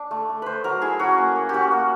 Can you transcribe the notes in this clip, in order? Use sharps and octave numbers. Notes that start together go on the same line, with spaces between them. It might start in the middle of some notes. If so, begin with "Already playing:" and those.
Already playing: D4
A3
A3
A3 B4 C5
F#3 A#4
E4 G#4
C#4 F#4
A#3
A#3
C#4 F#4 G4
A#3